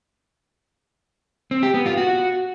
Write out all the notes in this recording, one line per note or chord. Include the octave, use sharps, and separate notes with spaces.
C4
G4
B3
F4
F#4